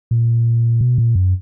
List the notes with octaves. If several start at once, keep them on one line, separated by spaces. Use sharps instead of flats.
A#2
B2
A#2
F#2